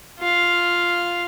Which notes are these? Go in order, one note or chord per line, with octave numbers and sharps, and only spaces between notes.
F4 F5